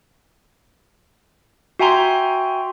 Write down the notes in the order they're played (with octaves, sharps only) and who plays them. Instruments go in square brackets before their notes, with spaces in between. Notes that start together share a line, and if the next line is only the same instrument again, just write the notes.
[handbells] F#4 E5 G5 G#5 A#5 C6